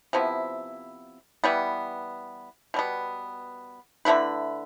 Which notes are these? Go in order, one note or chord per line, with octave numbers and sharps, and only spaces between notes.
C3 F3 B3 E4
E3 G3 B3
B2 G3 B3
D3 A3 E4 B4